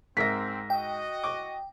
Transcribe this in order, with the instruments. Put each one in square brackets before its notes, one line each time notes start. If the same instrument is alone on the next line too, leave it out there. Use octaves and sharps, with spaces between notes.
[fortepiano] G#2 A#4 E5 [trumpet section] C4 [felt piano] A#6 B6
[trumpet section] F#4 D#5 [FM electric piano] G5
[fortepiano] C#6 D6